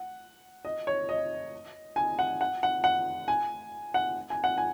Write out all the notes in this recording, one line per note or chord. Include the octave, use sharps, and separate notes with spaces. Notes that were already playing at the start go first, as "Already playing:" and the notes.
Already playing: F#5
D#5
C#5
D#5
G#5
F#5
F#5
F#5
F#5
G#5
F#5
G#5
F#5
G#5